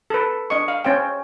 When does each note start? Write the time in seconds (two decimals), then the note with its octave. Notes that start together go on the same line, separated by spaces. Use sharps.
0.10 A4 B4
0.50 D4 D#5 C#6
0.68 F5
0.84 C#4 C5 G5